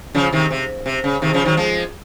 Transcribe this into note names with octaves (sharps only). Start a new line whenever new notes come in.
C#3 F3
C3 D#3
C3
C3
C#3
C3 D#3
C#3 F3
D#3 F#3
F3 G#3